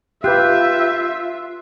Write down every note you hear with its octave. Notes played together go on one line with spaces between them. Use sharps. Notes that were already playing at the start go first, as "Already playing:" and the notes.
F4 G4 B4 E5 F#6 G6